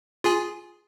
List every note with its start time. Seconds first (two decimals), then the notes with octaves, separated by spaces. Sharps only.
0.24 F4 G#4 G#5